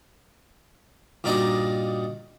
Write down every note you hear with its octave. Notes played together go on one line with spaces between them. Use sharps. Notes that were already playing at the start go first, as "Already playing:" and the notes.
G2 A#2 D4 D#4 F#4 D#5